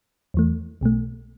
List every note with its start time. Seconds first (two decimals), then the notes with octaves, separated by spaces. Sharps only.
0.34 E2 E3 A3
0.81 B1 B2 A3